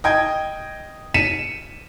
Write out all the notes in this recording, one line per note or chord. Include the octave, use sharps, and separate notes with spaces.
D#5 G5 G#6
B6 C#7 D#7 E7